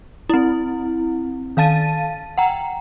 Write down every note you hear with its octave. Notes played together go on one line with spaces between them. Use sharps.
C4 E4
D#3 F5 A5 A6 D#7
F#5 G5 A#5